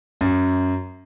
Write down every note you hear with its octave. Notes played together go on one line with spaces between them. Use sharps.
F#2